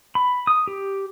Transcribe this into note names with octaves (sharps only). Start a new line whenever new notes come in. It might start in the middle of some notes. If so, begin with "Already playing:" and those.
B5
D#6
G4